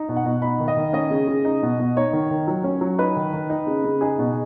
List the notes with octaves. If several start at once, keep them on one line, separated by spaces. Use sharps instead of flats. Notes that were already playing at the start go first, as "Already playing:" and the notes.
Already playing: D#4
B2
F#5
B2
D#4 B5
D#3
D#5
D#3
C#4 D#5
C#3
C#3
D#4
B2
B2
D#4 C#5
D#3
D#3
F#3
C#4
F#3
D#4 B4
D#3
D#3
D#4
C#3
C#3
D#4 G#4
B2